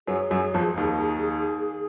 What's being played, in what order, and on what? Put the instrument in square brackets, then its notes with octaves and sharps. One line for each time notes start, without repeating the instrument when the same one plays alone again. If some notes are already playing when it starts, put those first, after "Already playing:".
[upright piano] F#2 F#3 [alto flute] G#4
[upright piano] F#2 F#3
F2 F3
D#2 D#3